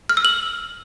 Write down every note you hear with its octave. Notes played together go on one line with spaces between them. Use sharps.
F6
E6
F#7